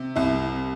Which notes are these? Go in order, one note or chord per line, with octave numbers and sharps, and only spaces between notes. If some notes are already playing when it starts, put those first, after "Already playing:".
Already playing: C3
C2 E4